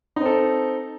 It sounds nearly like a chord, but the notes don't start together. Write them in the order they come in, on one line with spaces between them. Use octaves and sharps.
D#4 C4 A4